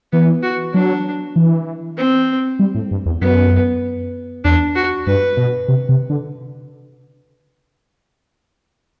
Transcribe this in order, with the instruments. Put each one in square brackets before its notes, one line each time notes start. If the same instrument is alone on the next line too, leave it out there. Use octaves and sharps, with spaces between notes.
[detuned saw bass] E3 [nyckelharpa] B3
[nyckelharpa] F#4
[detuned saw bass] F#3 [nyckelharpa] D4
[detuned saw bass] E3
[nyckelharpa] C4
[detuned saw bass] G3
A2
G2
E2
[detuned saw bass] F#2 [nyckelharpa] B3
[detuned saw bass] E2 [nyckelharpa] D4
[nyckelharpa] F#4
[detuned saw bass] G2 [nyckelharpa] B4
[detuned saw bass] B2
C3
C3
D3